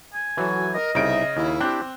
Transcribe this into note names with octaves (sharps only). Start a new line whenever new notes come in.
G#5
E3 F#3 F#4 A4
A#4 D#5
C2 C#3 D#4 E5 D7
D#2 E4
C4 D4 G4 F#6